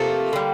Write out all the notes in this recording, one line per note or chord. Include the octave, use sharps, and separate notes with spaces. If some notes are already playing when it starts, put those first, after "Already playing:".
Already playing: C3 F3 A3 A#3
D3 G3